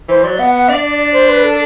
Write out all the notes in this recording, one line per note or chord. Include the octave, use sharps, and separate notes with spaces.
E3 C5
F#3 D5
B3 F#5
F#5
D4 D5
D5
D5
C5
B4
A4